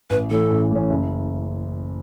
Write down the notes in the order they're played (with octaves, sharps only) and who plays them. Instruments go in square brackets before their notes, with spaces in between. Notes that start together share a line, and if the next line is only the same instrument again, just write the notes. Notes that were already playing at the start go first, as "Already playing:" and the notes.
[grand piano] A1 [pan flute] B4
[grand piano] A2 E3 C#4 [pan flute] A4
[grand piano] A1
A2 E3 C#4
F#1